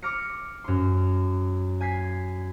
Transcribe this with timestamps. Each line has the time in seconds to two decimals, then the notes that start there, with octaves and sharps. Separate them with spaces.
0.02 D6 F6 A#6 C#7
0.64 F#2 C6
1.81 G#5 G#6 B6 C7